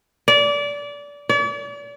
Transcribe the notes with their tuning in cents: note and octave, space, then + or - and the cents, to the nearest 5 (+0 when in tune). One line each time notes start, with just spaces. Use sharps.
D5 -25
D5 -40